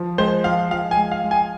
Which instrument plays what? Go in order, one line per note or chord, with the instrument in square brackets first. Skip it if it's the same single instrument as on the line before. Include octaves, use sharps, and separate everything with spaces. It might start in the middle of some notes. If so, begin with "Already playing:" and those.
Already playing: [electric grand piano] F3
[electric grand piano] G#3 [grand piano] C5
[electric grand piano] F3 [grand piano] F5
[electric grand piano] F3 [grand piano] F5
[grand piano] G#5
[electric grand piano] G#3
[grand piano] F5
[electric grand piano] G#3
[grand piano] G#5